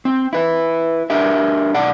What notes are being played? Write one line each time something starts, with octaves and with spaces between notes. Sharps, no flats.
C4
E4 B4
D4 G4 A#4 E5
B1 D5 F#5